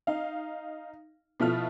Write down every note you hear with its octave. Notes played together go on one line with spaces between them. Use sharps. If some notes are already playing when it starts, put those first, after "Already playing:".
D#4 F5
B2 F3 E4 F4 A4 F6